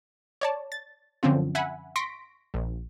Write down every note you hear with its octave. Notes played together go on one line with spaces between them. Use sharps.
C#5 D5 A5
A6
F#2 D3 F3 C4 C#4 F4
E5 F#5 G#5 B5
C6 C#6 A#6 B6 D7
A#1